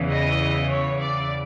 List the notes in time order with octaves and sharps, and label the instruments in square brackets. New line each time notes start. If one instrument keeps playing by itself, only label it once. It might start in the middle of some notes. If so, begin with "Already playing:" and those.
Already playing: [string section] E2 C#3 E3
D#5
C#5
D5